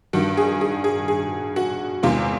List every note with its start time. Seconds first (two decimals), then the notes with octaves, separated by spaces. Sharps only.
0.13 G2 D#3 G3 F#4
0.37 G#4
0.61 G#4
0.84 G#4
1.08 G#4
1.56 F#4
2.03 E2 C3 D#3 G#3 C4 F4